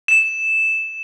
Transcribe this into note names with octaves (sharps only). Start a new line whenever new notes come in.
E7